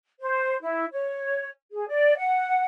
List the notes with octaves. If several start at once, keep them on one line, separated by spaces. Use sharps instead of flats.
C5
E4
C#5
G#4
D5
F#5